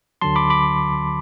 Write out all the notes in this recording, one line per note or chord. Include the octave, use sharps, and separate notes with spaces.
D2 D3 F#3 A5 C6
B5 D6
B5 D6